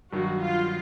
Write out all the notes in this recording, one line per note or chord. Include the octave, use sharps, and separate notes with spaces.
G2 D#3 F#3 F#4
F4